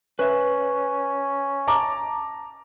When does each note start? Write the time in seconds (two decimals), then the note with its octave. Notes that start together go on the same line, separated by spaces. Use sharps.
0.19 C#4 B4 E5
1.68 A5 A#5 D6